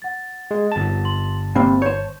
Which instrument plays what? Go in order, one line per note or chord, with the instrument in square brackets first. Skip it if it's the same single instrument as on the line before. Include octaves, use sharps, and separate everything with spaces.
[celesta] F#5 A6
[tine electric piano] G#3
G1 A5
[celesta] C6 F#7
[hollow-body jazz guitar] C3 A#3 C4 [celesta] C5 G5 B5
[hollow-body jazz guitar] C5 C#5 [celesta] G6